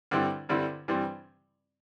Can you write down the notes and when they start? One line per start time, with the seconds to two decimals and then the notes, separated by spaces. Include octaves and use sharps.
0.11 G2 D3 G3 C4 E4
0.49 G2 D3 G3 C4 E4
0.88 G2 E3 G3 C4